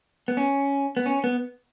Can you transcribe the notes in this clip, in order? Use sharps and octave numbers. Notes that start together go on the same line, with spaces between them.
B3
C#4
B3
C#4
B3